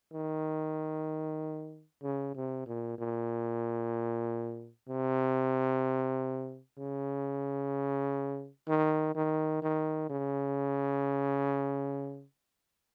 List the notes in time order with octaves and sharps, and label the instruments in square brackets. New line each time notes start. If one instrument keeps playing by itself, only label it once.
[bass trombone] D#3
C#3
C3
A#2
A#2
C3
C#3
D#3
D#3
D#3
C#3